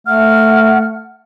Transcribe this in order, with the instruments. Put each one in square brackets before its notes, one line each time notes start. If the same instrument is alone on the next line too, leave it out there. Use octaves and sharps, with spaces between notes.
[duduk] A3 [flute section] F#5 F6